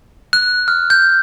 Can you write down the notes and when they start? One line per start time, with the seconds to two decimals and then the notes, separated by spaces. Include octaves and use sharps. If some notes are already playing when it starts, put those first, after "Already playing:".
0.33 F#6
0.68 F6
0.90 G6